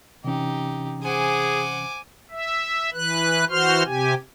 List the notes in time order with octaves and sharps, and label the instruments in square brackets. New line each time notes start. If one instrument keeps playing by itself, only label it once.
[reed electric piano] C3 E3 C#4 [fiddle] D#4 G4
[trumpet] G#4 [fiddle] C5 F#5 [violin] G#5 D6
[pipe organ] E5
E3 B4 F#6
E3 F#4 C5 C6 F6
C3 G4 G#5